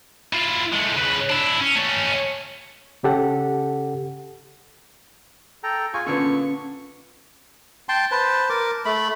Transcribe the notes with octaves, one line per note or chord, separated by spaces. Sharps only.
E4 F4
G#3 A3
C#3 B4
D4 E4
C#4
A3 C#4
C#3 C#4 G4 A4 F#5
A4 G5 A#5
F4 G#4 G#5 C#6
A#2 D3 B3 C#4 C#6
G5 A5 C6
B4 C5 A5
A#4 D6
A3 B5